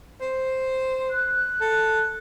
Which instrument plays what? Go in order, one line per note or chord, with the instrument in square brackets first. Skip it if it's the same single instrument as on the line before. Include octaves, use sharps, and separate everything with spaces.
[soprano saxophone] C5
[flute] F#6
[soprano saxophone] A4